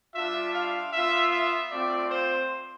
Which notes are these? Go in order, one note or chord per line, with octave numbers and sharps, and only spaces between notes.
G3 D4 F4 E5
F5
B3 F4 E5
E5
A3 C4 F4 D5
C5